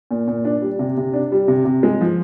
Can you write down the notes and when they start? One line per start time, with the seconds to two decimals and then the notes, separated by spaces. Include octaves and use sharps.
0.11 A#2
0.28 A#2
0.45 D4
0.62 G3
0.79 C3
0.97 C3
1.13 D4
1.32 G3
1.48 C3
1.65 C3
1.83 G#3
2.01 F3